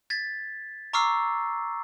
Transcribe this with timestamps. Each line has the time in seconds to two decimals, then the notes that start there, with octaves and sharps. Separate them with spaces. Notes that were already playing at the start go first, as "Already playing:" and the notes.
0.10 G#6 A6 B6
0.93 A#5 C#6 D6 E6 F6 C7